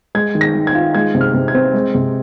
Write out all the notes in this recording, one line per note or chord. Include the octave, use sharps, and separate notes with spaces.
G#3 G#6
D#3
A#6
D#3
G#6
F4
G#3 G#6
C3
F6
C3
G#6
C4
G#3
C3